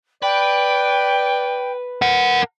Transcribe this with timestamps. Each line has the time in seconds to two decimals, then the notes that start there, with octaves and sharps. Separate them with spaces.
0.23 B4 D5 G5
2.02 A#4 F#5